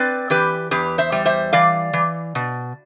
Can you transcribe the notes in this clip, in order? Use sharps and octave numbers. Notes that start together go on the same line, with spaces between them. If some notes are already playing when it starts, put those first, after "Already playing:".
Already playing: C4 B4 D5
E3 G4 B4
E2 G4 B4
C5 E5
G3
C5 E5
E3 D5 F5
E3
B2